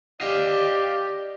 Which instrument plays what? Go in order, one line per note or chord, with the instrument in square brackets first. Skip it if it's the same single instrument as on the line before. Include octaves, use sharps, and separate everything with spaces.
[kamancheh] G4 [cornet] D5 [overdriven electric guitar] D#5 F5